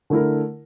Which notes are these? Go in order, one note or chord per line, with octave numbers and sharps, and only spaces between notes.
D3 A3 E4 A#4